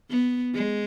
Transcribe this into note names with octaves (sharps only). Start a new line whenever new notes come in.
B3
G#3